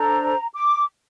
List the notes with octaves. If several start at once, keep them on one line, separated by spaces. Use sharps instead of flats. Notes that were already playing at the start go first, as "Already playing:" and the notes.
Already playing: D4 A4 C5 A#5
D6